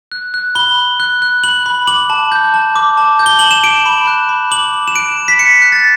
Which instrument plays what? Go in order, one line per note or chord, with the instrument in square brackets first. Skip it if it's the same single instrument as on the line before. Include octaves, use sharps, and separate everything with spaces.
[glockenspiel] F#6
F#6
B5 G7
B5
F#6
F#6
B5 F#7
B5
D6 F#7
A5
G6
A5
D6
A5
G6
G7
A5 F#7
E7
D6 D7
B5
F#6
B5
D6 F#7
B5
E7
F#6 D7
B5
B6
F#6 C#7
F#6
A6